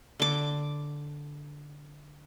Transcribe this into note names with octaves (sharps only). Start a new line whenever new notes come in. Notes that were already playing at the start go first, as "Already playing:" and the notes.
D3 D6